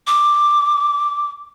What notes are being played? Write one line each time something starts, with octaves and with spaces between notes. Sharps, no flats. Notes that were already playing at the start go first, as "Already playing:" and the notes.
D6